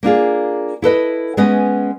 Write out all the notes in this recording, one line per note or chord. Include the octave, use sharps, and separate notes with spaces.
A#3 D4 F4 G#4
E4 A4 B4 D#5
G#3 B3 C#4 B4 D#5